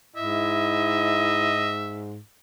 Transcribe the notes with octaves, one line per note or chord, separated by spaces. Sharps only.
G#2 E4 D#5 E5